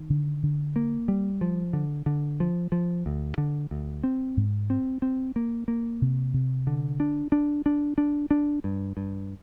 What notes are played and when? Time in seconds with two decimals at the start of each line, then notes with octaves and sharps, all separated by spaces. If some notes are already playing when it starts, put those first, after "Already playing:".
Already playing: D#3
0.10 D3
0.43 D3
0.76 A#3
1.08 G3
1.41 F3
1.73 D3
2.06 D3
2.40 F3
2.72 F3
3.06 D2
3.38 D3
3.71 D2
4.04 C4
4.37 G#2
4.70 C4
5.02 C4
5.36 A#3
5.68 A#3
6.02 C3
6.34 C3
6.67 D3
7.00 D4
7.32 D4
7.66 D4
7.98 D4
8.31 D4
8.64 G2
8.97 G2